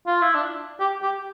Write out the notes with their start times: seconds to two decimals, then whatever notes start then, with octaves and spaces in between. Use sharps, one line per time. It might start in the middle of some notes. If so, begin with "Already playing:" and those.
0.07 F4
0.22 E4
0.35 D4
0.80 G4
1.02 G4